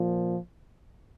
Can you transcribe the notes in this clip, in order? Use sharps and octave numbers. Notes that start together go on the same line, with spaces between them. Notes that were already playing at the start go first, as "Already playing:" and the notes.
Already playing: A#2 F3